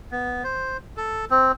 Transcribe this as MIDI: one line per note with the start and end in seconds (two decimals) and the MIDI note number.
0.11 0.43 59
0.44 0.77 72
0.97 1.25 69
1.31 1.52 60